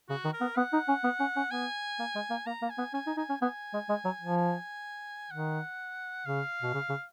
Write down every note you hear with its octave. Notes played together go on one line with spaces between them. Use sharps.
C#3 F#4
D#3
A#4
B3
B3 F#5
D#4
C#4
B3
C#4
C#4
B3 G#5
A#3
G#3
A#3
A#3 A#5
A#3
G#5
B3
C#4 G#5
D#4
D#4 G#5
C#4
B3 G#5
G#3
G#3
F#3
F3
G#5
D#3 F#5
C#3 F5
B2
C#3
C#3